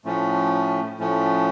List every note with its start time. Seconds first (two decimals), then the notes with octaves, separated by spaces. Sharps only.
0.05 A2 F3 A3 C#4
0.99 A2 F3 A3 C#4